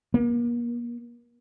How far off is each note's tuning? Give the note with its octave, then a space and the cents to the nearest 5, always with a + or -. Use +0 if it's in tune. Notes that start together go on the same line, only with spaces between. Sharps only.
A#3 +40